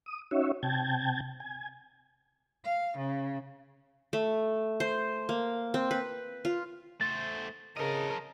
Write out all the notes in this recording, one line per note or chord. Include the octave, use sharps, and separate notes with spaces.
D#6
C#4 D#4 F#4 C#5 E5
C3 G5 A5 G#6
G#5
F5
C#3
A3
C5
A#3
C4
B4
F4
A3 C5 A6
C#3 A4 A#4 D#5